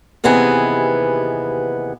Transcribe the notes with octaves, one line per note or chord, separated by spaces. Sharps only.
D#2 C3 E3 B3 G#4